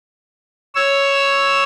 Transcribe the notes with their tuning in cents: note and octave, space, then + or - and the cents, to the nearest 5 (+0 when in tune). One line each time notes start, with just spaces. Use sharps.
C#5 +0 E6 +0